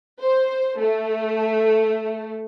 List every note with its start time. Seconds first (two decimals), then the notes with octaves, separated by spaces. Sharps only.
0.21 C5
0.79 A3